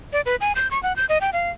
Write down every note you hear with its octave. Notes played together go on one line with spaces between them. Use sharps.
D5
B4
G#5
G6
C#6
F#5
G6
D#5
G5
F5